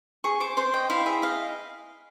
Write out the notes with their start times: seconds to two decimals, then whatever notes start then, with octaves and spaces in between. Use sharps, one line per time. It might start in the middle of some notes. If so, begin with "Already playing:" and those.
0.24 G#4 C#6
0.40 C5 D6
0.57 C5 C6
0.74 D#5 G5
0.90 E4 F5
1.06 G#4 E5
1.22 D#5 F5